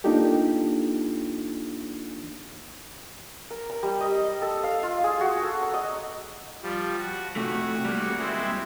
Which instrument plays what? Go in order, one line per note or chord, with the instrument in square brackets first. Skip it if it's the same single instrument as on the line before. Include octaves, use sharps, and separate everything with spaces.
[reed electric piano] A#3 D4 D#4 F4 G4 A4
[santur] A#4
A#5
G3
D#5
A4
F5
F4
G#4
F#4
A4
A#5
D#5
[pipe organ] F3 G3
F#4
[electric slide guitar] C3 A3 [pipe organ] F#4
[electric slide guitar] G3 A#3
[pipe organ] G#3 C4 E4